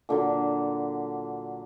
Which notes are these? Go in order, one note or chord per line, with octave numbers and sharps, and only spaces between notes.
A#2 D3 F#3